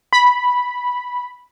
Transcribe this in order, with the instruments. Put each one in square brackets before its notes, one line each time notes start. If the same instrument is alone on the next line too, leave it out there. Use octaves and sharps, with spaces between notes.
[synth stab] B5